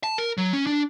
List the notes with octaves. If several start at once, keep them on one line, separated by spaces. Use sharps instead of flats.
A5
A#4
F#3
C#4
D4